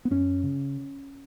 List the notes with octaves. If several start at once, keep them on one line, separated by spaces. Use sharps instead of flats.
B3
F#2 C#4
C#3